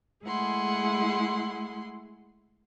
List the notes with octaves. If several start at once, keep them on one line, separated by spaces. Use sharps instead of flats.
G#3 A3 E4 G#4 F#5 C6